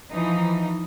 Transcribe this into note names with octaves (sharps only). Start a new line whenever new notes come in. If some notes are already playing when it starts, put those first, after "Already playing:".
E3 F3 D#4